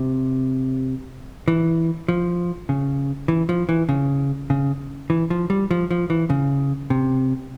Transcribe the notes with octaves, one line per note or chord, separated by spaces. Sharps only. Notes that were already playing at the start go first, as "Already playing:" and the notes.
Already playing: C3
E3
F3
C#3
E3
F3
E3
C#3
C#3
E3
F3
G3
F3
F3
E3
C#3
C3